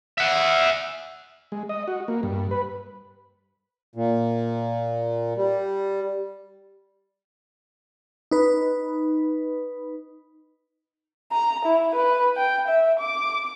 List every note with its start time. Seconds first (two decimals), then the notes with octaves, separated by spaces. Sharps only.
0.18 E5 F#5
1.52 G#3
1.69 D#5
1.88 F#4
2.08 A#3
2.23 G2
2.51 B4
3.95 A#2
5.37 G3
8.31 D#4 B4
11.32 A#5
11.65 E4
11.95 B4
12.36 G5
12.67 E5
12.99 D6